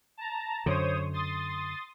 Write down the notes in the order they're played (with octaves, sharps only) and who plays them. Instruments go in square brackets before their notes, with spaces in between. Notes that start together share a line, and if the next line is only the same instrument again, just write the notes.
[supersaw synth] A5 A#5
[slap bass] F#2 D3 [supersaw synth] C5 C#5 D#6
[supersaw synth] C6 D#6 A6